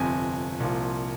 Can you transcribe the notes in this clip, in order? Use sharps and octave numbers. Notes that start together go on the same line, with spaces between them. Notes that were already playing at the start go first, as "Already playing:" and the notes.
Already playing: G1 F2 C3 G#5
C2 A#2 F3